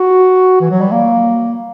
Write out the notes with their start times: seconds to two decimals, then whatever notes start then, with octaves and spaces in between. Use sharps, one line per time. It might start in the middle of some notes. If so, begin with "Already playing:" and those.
Already playing: F#4
0.60 E3
0.71 F#3
0.81 G3
0.92 A#3